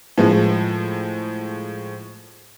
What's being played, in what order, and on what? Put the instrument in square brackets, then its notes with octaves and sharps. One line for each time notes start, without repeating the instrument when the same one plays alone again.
[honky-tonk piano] A2 F3 G#3